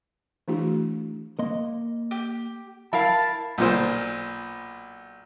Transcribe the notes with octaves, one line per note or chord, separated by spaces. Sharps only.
E3 A3 D4 E4 F#4 G#4
A#3 D#5 C6
G4
E4 A#4 E5 F5 A5 B5
B1 A#2 C5